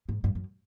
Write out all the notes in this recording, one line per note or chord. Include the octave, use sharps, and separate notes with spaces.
G#2
G2
F#2